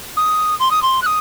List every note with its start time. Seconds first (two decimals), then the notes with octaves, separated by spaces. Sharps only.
0.17 D#6
0.59 C6
0.71 D#6
0.82 C6
1.01 F#6
1.06 D#6